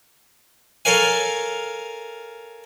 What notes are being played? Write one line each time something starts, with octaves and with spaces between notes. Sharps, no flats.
A4 A#4 C#5 F5 G#5